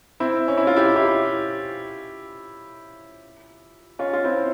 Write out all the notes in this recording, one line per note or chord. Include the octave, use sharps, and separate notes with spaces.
C4 E4
C#4
E4
F4
E4 G4
E4 G4
C#4 F4
F4
C4 E4